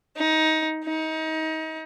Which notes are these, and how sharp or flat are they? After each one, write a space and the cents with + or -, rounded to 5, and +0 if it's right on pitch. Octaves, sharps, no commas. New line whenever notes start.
D#4 +20
D#4 +30